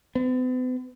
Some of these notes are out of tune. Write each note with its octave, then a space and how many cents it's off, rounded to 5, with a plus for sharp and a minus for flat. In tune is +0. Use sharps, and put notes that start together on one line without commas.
B3 +45